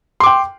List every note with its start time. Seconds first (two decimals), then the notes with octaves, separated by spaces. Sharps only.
0.20 C6
0.23 D6
0.26 G5